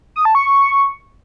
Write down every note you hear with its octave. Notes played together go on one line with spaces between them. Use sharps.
D#6
A5
C#6